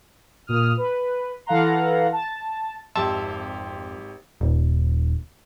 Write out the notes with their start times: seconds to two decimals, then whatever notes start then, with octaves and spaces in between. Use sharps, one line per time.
0.47 A#2 D#6 F6
0.77 B4
1.46 E3 A4 F5 F#5 A#5 C6
2.12 A5
2.95 G#1 F2 F3 G4 E5 A5 C6
4.41 D#1